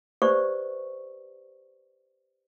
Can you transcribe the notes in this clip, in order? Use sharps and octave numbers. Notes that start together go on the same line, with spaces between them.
G4 B4 C5 D5 E5 C#6